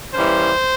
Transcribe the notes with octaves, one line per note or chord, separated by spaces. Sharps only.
E3 G3 A#3 C#4 C5